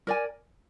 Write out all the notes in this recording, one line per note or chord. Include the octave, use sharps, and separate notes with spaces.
A#4 D5 G#5